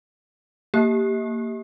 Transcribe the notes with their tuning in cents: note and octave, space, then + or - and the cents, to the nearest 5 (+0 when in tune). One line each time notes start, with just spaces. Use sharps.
A#3 -15 G4 +0